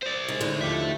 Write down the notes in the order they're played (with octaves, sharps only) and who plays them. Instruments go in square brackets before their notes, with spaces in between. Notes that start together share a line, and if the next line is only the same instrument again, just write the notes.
[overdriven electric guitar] C5 D5
[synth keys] G#2 G#3 [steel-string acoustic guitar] C#3
[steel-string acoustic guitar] A2 D3 D#4
[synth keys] D#2 F3 G4 [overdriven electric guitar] A4 E5